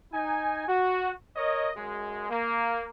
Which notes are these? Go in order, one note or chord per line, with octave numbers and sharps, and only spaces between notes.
D#4 G#5
F#4
A#4 C#5 D#5
F#2 G#3
A#3